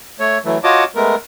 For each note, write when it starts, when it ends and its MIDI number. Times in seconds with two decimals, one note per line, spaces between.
0.20 0.38 57
0.20 0.38 73
0.45 0.58 52
0.45 0.58 54
0.45 0.58 57
0.64 0.84 65
0.64 0.84 66
0.64 0.84 73
0.64 0.84 75
0.64 0.84 81
0.64 0.84 86
0.96 1.15 56
0.96 1.15 57
0.96 1.15 59
0.96 1.15 70